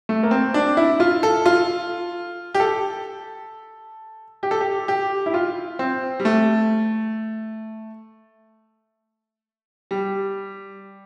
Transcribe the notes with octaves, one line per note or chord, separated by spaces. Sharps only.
A3
A#3
C4
D4
E4
F4
A4
F4
G4
A4
G4
A4
G4
G4
E4
F4
C4
G3
A3
G3